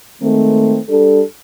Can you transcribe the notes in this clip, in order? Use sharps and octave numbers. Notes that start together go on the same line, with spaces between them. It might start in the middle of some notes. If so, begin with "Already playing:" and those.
D#3 G#3 A3 C4
G3 D4 A4